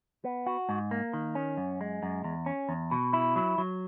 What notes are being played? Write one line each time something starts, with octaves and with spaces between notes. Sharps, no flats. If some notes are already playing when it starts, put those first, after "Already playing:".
B3
F#4
G#2
A#3
D#3
C#4
F#2
G#3
F#2
E2
C#4
E2
B2
E4
F#3
F#3